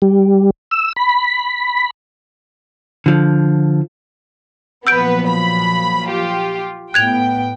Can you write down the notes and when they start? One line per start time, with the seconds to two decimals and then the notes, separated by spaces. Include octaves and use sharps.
0.02 G3
0.71 E6
0.96 B5
3.06 D3 F3
4.87 A#2 F3 F#3 B3 B4 E6 G6 D7
5.27 B5
6.05 F4 G4
6.94 A2 B3 G5 F#6 G#6 F7